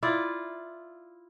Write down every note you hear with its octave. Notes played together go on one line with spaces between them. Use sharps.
E4 F4 D5